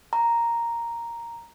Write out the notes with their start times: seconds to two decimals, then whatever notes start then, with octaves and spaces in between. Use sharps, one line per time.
0.13 A#5